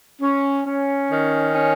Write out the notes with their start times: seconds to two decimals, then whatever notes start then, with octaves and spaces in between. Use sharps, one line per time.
0.22 C#4
0.66 C#4
1.10 D#3
1.55 C#4